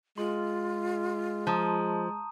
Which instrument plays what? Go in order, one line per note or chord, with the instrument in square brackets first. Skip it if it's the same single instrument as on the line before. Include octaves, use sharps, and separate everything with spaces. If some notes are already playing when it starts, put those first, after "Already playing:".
[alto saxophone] G#3 [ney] F4 [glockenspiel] C6
[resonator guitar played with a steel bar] F3 [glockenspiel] A5 A#5 D#6